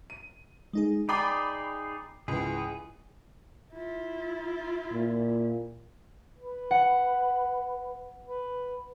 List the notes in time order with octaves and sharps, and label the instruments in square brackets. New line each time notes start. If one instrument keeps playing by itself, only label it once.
[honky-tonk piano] D#7
[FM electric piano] G#3 D#4 G#4
[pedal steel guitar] D#4 G#4 D5 [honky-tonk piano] G5 B5 D6 [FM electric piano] C7
[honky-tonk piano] C#2 E3 [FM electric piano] G#2 [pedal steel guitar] G#4
[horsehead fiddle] E4 F4
[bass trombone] A#2
[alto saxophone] B4
[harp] F#5
[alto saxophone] B4